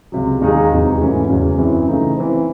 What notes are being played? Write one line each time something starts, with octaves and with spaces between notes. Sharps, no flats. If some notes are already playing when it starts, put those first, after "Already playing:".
C#2 C3 F#3
D#2 D#3 G#3 D#4 G#4
E2 C3 F#3 C4 D#4
G#2 E3 A3 C#4 F#4
E2 C#3 F#3
F#2 E3 C4 E4
C#3 E3 A3 D#4
E3 C4 E4 C5